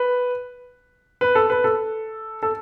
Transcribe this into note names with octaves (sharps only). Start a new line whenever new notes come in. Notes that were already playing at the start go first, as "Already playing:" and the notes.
Already playing: B4
B4
A4
B4
A4
A4